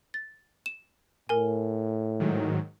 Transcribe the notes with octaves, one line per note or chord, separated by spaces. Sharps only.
A6
E7
A2 A#4 G#5
G#2 D#3 F#3